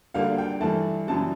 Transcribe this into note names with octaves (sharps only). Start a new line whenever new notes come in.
D2 D3 G3 A#3 F5
G5
G2 E3 A3 A5
F#2 C#3 E3 G3 A5